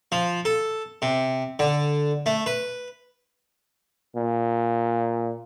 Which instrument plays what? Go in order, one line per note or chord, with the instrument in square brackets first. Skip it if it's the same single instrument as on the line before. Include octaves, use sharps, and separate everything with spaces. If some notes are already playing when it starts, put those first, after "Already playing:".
[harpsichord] F3
A4
C3
D3
A3
B4
[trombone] A#2